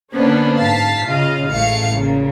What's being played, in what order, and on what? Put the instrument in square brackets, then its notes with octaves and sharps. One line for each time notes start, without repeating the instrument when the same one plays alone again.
[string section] D3 A#3 B3 C#4 D4 C5
G#2 F5 A5 A6 B6 C7
C#3 F4 D#5 F5
A1 G#3 A3 F5 C#7
A#2 C#3